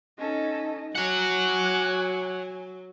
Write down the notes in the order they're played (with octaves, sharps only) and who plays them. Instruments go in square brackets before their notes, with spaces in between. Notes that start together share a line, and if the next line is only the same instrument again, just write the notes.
[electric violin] C#4 A4 [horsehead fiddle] D#4 D#5
[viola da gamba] F#3 [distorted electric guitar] C#5 F#5 [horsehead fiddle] G#5 [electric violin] D6 F#6